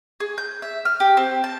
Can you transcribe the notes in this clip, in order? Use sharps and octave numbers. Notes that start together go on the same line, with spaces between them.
G#4
G6
E5
F6
G4
C4
A5